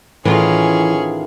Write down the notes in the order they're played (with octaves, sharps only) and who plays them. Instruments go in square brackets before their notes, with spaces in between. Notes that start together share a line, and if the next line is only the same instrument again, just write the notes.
[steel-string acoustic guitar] A2 D#3 F4 [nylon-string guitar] E3 [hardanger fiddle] C#4 G#4